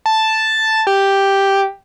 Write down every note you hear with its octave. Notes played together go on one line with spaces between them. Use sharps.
A5
G4